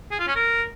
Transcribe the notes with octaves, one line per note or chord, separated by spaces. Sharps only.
G#4
F4
C#4
A#4